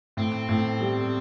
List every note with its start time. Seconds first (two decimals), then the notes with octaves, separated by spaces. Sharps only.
0.17 A2 C4
0.49 A2
0.81 G3